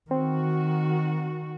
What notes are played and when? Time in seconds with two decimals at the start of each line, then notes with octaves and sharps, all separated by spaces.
0.11 D#3 C4 F#4